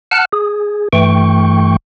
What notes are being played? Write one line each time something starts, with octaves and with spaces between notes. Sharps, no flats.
F#5 A5 F6 F#6
G#4
G2 E3 A3 G5 C#6